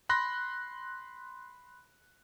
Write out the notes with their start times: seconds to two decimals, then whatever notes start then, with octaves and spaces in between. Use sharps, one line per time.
0.09 B5 C6 F#6 A#6